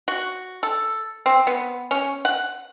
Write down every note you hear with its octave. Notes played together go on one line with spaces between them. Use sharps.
F#4
A4
C4
B3
C#4
F#5